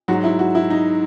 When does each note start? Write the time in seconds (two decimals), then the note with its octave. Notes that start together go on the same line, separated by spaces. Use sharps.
0.08 G#2 F#3 F#4
0.24 E4
0.39 F#4
0.55 E4
0.70 D#4